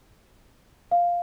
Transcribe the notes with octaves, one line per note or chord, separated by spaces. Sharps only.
F5